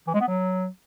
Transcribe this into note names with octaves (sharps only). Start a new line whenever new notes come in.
E3
G#3
B3
F#3